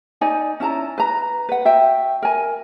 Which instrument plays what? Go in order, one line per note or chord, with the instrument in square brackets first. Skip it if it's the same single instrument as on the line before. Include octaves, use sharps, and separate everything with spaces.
[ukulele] D#4 D5 G#5
C#4 E4 A5 A#5
B4 A#5
B4 F#5
F#4 E5 G5
A#4 G#5